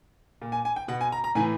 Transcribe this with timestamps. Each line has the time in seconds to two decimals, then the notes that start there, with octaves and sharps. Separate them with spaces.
0.41 A#2
0.52 G#5
0.65 G#5
0.76 G5
0.88 B2 F#5
1.01 G#5
1.12 A#5
1.24 A#5
1.35 A2 E3 G#5